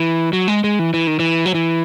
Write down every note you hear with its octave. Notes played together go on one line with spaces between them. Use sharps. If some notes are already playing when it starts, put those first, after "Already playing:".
Already playing: E3
F#3
G#3
G#3
E3
E3
D#3
E3
F#3
E3